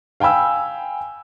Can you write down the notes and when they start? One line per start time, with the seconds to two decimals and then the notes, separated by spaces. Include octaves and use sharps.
0.20 F5 G5 G#5 B5 E6